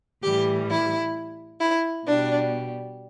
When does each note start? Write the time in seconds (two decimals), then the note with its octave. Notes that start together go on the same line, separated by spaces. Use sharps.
0.22 A2 E3 G3 G4
0.69 E4
1.60 E4
2.06 B2 G3 D4